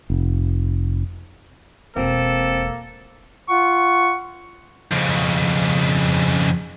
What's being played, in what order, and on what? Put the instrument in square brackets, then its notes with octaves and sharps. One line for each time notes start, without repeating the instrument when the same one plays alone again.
[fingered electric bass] F1
[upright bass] E1 [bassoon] A#3 [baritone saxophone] C4 [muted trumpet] A4
[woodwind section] F4 F#5 C#6
[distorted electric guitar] F2 C#3